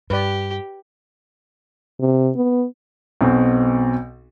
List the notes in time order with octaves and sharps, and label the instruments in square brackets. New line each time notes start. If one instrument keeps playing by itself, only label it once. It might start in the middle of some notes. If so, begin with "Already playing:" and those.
[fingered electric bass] G2 [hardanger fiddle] G4 [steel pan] B4 D5
[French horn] C3
B3
[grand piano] B1 B2 C4